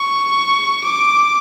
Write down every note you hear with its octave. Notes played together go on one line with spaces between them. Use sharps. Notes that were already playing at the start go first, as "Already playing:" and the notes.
Already playing: C#6
D6